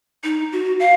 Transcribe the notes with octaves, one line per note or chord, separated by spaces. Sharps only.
D#4
F#4
F5